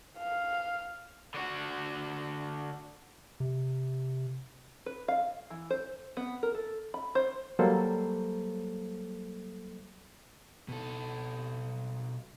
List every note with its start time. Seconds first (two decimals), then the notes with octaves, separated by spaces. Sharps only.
0.18 F5
1.34 D3 F#4
3.40 C3
4.86 B4
5.08 F5
5.50 E3
5.70 C5
6.17 B3
6.43 A#4
6.55 A4
6.94 B5
7.15 C5
7.59 F#3 G3 A#3 A4 C5
10.69 B2 A4